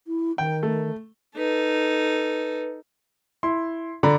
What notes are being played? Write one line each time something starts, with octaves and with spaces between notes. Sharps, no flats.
E4
D#3 G5
A3
D#4 A4 B4
E4 C6
D3 D5 A#5 B5